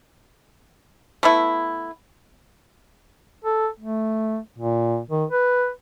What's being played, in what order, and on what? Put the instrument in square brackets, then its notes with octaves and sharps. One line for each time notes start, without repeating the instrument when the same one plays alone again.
[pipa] A3 B3 E4
[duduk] A4
A3
A#2
D#3
B4